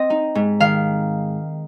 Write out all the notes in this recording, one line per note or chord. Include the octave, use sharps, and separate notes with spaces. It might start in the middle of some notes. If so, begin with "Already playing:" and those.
Already playing: C4 D#5
D#4
G#2
D#3 F5